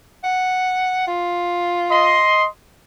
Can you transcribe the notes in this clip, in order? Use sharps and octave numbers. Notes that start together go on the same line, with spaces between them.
F#5
F4
D#5 C6